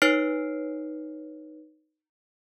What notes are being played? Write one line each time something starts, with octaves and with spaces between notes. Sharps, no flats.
D#4 B4 C#5 F6 C7 D7